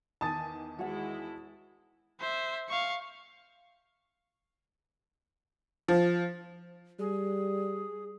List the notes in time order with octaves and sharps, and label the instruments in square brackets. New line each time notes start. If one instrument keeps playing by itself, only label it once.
[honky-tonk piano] E2 D#3 G#5 [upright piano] A5 D#6 A6
[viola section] G#3 E4 [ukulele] F#4 C#5 F#5
[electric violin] C5 E5
F5 C#6
[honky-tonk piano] F3
[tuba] G3 [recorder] G#4